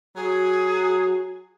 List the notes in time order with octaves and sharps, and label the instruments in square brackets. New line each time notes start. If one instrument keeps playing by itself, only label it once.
[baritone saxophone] F#3 [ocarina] F#4 [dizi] G#4